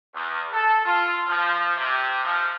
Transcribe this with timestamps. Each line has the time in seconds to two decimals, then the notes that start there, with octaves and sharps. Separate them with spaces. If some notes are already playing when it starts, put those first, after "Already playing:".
0.13 E2
0.52 A4
0.84 F4
1.27 F3
1.77 C3
2.24 F3